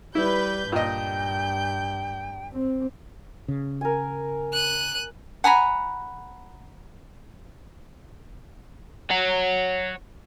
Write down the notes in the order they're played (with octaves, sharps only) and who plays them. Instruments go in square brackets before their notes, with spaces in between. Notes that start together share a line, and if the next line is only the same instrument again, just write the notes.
[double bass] G3 [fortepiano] E4 [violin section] B4 G6
[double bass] G2 [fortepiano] A#2 D#5 [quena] G5 [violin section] G6
[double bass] C4
[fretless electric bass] C#3
[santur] A#4 G#5
[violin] F#6 D#7
[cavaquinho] F#5 G#5 A#5 B5
[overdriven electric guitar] C#5 F#5